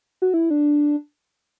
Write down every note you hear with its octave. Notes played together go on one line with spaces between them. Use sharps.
F#4
E4
D4